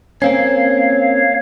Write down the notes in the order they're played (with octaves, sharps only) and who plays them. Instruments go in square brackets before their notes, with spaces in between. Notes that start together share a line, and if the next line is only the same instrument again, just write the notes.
[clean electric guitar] A#3 C4 C#4 [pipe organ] C#5 F5